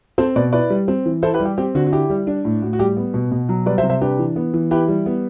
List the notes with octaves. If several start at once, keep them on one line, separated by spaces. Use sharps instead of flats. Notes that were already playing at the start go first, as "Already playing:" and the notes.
C4 A4 C5
B2 B4 D5
E4 B4 D5
G3
C4
E3
E4 A4 C5
G4 B4
G3
G4
C4 G4
D3 F#4
F#4
E4 G4
G3
D4
A2
A2 F#4
F#4
G3 G4
B3
B2
B2
F#3
G3 B4 D5
C5 E5
C3
C5 E5
D4 G4 B4
E3
B3
E3
E4 G4 B4
G3
B3